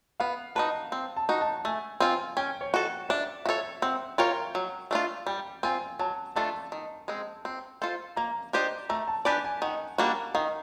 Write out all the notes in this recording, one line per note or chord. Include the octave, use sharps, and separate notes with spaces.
B3 F5
D#4 F#4 B4 A5
C4
A5
D#4 F#4
A5
A3 G#5
C4 F4 G#5
C#4 G5
C#5
F#4 A4
D4 E5
F#4 A4 C#5 E5
C4 F#5
F4 A#4 C#5 G5
F#3
A3 D4 F4
G3 G5
C4 F4 G#5
F#3 A5
A3 D4 F4 A4 A5
D#3
G#3 C4
C4
F4 A4 C5
A#3 A#5
D4 G4 C5 D#5
A3 A#5
A5
D4 G4 B4 D5 G#5
G#5
D#3 F#5
G3 A#3 D4 F#4
D#3 F5